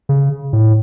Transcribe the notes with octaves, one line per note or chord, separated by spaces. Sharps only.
C#3
A2